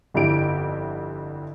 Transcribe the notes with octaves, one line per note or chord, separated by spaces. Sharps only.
G1 F2 D3 E4 G4 D7